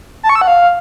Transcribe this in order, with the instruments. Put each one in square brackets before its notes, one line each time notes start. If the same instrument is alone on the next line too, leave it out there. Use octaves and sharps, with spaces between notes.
[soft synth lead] A5
C#6
E6
F#5
F5